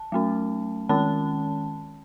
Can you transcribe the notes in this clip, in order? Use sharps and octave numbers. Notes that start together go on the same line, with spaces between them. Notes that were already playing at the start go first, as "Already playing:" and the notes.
Already playing: A5
F#3 A3 C#4
D#3 G#3 C#4 A5